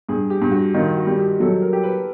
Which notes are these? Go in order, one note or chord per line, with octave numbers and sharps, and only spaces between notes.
G2 G#4
G4
G2
F#4
D#3 F4
F#4
G3
G4
F#3 A4
A#4
G4
B4